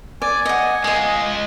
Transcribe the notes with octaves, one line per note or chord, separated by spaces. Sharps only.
D5 G#5
D#5 F#5
G#3 F4 G#4 D#5